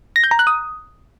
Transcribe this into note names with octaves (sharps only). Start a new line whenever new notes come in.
A#6
G6
A#5
F#6
D#6